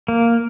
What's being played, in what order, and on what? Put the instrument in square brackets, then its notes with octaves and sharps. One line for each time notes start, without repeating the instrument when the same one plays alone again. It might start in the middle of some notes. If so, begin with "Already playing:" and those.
[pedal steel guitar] A#3